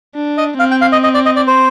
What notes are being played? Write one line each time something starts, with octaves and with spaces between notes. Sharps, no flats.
D4
D#5
C4 F5
G5
F5
D#5
D#5
D5
D#5
D5
C5